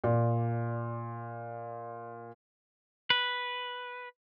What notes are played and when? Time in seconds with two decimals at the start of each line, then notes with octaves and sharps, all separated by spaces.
0.04 A#2 D5
3.10 B4